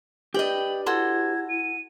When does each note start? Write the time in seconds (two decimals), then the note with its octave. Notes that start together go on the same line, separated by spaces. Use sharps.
0.34 G4 B4 D5 D#5 G5 F#7
0.86 E4 F#4 A4 C6 G#6
1.48 D#7